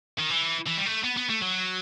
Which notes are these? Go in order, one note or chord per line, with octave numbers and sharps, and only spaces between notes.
D#3
E3
E3
G3
A3
B3
B3
A3
F#3